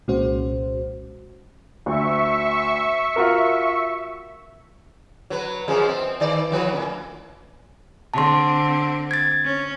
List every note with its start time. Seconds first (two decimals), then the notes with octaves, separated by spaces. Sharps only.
0.08 C2 A#2 G#3 C#4 F#4 C5
1.86 D2 E5 C#6
3.16 F4 F#4 A#4
5.30 F#3 B4
5.68 F#2 F3 G#3
5.89 C4
6.20 D#3 D5
6.51 E3 F3 B4
6.73 A2 C#3
8.14 D3 C4 A5 C6
9.11 G#6 A6
9.44 C#4